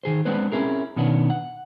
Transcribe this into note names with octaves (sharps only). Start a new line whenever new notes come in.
D#3 G#4 C5
G#3 B3 C4 D4 B4 C5
C4 C#4 E4 G#4 A#4
B2 D#3 B3 C#4 D4
F#5